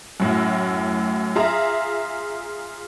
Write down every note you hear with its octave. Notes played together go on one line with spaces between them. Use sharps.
F#2 A2 F#4
F4 G#4 E5 A#5